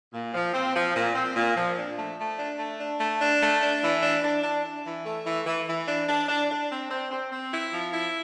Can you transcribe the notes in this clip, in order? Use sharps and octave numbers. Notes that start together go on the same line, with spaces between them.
A#2
F3
C4
F3
A#2
C4
A#2
F3
D4
A3
A3
D4
A3
D4
A3
D4
A3
D4
E3
D4
D4
D4
D4
E3
A3
E3
E3
E3
D4
D4
D4
D4
C4
C4
C4
C4
E4
F3
E4